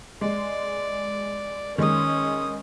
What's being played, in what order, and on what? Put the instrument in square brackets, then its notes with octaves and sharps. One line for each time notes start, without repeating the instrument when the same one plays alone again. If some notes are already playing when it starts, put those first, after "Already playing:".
[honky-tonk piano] G#3 [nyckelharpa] D5
[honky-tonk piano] D#3 G#3 [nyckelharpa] C#4 D#6